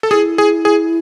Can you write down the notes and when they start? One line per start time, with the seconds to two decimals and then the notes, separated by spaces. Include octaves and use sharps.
0.03 A4
0.11 E4 G#4
0.38 G#4
0.65 G#4